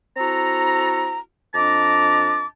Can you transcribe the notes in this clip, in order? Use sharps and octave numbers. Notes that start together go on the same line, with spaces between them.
C4 E4 F#4 A4 A#5
F2 D4 D#5 A5 A#5 D6